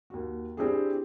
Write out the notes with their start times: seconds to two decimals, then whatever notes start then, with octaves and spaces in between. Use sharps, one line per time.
0.10 D#2 F#4
0.57 C4 D4 E4 G4 G#4